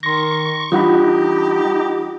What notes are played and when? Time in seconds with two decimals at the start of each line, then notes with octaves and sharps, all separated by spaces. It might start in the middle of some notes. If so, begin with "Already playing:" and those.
0.03 D#3 C6 C#6 A#6
0.72 E3 G3 D4 D#4 F4 G4 F#5 B5